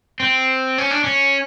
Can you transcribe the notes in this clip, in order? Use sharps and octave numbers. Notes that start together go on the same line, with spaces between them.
C4
C#4
D4
C#4